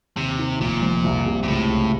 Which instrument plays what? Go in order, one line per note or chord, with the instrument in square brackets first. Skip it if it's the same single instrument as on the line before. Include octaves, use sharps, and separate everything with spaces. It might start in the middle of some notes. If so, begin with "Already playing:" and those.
[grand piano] D#2 [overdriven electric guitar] C3
[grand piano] D#3
[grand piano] F1 [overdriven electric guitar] A#2
[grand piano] F2
C2
C3
[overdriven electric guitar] A#2
[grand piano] C#2 [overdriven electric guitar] A2
[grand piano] C#3